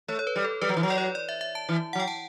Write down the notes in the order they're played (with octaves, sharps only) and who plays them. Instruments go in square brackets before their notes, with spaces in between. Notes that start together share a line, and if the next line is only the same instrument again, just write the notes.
[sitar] A3 [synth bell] C#5
[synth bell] C#5
B4
[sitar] G3
[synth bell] A4
[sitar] G3 [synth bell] B4
[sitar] F#3
E3
F#3
[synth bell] D5
C#5
D5
E5
E5
A5
[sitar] E3
[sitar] F#3 [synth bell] F#5
[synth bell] G5
A5